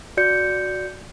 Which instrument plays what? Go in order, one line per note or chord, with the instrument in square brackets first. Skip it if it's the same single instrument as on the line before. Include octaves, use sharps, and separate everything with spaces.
[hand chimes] F#4 D5 G6 C#7